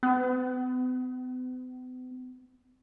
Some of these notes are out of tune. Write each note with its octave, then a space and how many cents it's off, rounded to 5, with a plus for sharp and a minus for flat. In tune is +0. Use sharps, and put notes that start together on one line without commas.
B3 +45